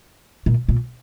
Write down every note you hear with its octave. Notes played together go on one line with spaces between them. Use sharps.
A#2
A#2